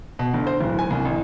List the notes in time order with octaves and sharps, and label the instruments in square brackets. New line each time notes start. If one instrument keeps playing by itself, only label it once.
[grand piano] B2
G1
C5
D1
G#5
C2
A1